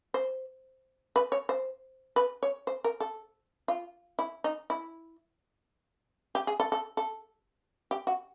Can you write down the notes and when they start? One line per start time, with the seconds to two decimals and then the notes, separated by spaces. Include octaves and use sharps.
0.14 C5
1.16 B4
1.32 C#5
1.49 C5
2.16 B4
2.43 C#5
2.67 C5
2.84 A#4
3.00 A4
3.68 F4
4.19 E4
4.44 D#4
4.70 E4
6.35 G4
6.47 G#4
6.60 A4
6.72 A4
6.97 A4
7.91 G4
8.07 F#4